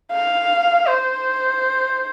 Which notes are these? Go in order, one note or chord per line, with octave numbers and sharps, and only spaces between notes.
F5
C5